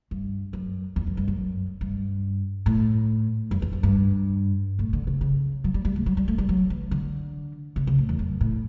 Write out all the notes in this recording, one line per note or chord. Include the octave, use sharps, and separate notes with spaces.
G2
F#2
E2
F#2
G2
F#2
G2
A2
F#2
E2
F#2
G2
A2
D3
C#3
C#3
F#3
G3
G3
A3
F#3
G3
A3
G3
F#3
E3
D3
C#3
C#3
A2
E2
F#2
A2